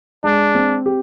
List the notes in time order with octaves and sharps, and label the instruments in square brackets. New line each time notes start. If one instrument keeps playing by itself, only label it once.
[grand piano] G#3 [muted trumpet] D4
[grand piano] C4
G4